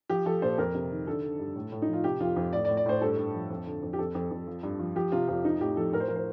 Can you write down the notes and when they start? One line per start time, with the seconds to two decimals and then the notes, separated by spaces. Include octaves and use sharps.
0.10 F3 G4
0.26 F3 A4
0.42 A#2 C5
0.58 F2 A#4
0.75 C3
0.91 D#3
1.07 D3 A4
1.23 D3
1.39 G2
1.56 A2
1.72 A2
1.82 D#4
1.88 F3
1.93 F4
2.04 C3 G4
2.20 F2 F4
2.36 F2
2.53 A2 D5
2.65 D5
2.69 A2
2.77 D5
2.86 A2 C5
3.02 G2 A4
3.17 G2
3.34 F3
3.50 F2
3.66 D3
3.83 F2
3.93 G4
3.99 F2 A4
4.15 F2
4.31 F2
4.47 F3
4.63 G2
4.79 F3
4.96 F3 G4
5.12 C3 F4
5.28 F2 F4
5.44 F3 D#4
5.61 A2 G4
5.77 F3 A4
5.93 A2 A#4
6.00 C5
6.08 F3 A#4
6.16 C5